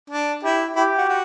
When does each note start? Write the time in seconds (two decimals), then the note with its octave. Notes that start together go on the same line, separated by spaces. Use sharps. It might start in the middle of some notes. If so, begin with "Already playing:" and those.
0.10 D4
0.43 E4 G4
0.76 E4 G4
0.98 F#4
1.09 F#4